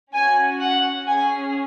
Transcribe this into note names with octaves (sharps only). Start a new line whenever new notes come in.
C#4 F#4 G#5
F#5
C#4 G#4 G#5